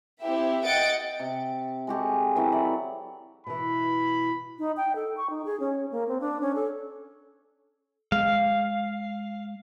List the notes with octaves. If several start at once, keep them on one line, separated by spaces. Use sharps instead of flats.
C4 E4 G4 E5
D#5 F#5 G5 A6 C#7 D7
C3
G#3 F#4 G4 A4
E3 F#3 C4 E4
D5 E5
B2 E3 B5
D#4
G5
A4
C#6
D#4
G#4
C#4
A#3
C4
D4
C#4
A4
G#3 F5